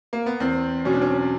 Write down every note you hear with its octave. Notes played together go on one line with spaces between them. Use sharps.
A#3
B3
E2 C4
B2 F#3 C#4
D4
C#4